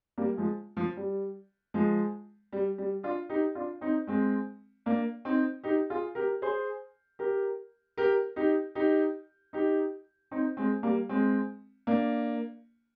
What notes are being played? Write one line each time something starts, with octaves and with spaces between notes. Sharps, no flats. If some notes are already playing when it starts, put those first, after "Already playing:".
G3 A#3
F3 G#3
F3
G3
F3 G#3
G3
G3
D4 F4
D#4 G4
D4 F4
C4 D#4
G#3 C4
A#3 D4
C4 D#4
D#4 G4
F4 G#4
G4 A#4
G#4 C5
G4 A#4
G4 A#4
D#4 G4
D#4 G4
D#4 G4
C4 D#4
G#3 C4
G3 A#3
G#3 C4
A#3 D4